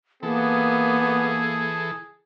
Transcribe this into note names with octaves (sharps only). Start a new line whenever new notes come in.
E3 A#3 B3 G#4 A4